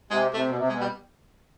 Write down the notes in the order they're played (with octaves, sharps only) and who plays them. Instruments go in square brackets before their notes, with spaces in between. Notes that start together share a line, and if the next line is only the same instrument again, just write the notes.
[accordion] C3 [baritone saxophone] G#3
[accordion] C3 [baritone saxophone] A3
[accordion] B2
C3
[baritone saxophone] G#3
[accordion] B2
[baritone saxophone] G3